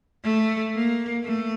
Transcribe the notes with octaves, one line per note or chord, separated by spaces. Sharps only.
A3
A#3
A3